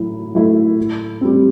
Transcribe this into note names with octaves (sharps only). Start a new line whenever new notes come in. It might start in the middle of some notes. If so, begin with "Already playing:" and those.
Already playing: A2 F#3 E4
F#3 A3 E4
A2
G3 C4